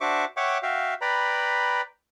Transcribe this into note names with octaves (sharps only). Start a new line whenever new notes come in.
D4 F#4 C5 E5 C#6 D6
C#5 E5 F#5 G5 C#6 D6
F#4 E5 F5 G5
B4 D5 G5 A#5 B5